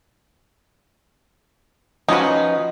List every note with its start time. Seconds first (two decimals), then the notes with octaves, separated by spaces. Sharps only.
2.08 F3 C#4 D#4 F#4 B4